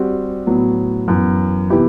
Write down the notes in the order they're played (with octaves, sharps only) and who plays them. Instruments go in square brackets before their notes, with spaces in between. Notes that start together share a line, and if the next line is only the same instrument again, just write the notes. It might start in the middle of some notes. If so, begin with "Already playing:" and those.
Already playing: [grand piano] G3 C4 F#4
A2 F#3 B3
F#2 E3 B3
C3 E3 B3 E4 G4